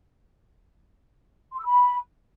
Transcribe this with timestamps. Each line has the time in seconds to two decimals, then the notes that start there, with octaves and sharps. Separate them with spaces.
1.52 C6
1.59 E6
1.65 B5